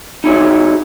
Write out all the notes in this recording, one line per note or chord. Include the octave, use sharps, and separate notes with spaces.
D#4 E4 F#4 G#4 C#5